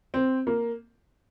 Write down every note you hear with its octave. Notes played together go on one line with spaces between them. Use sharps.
C4
A#3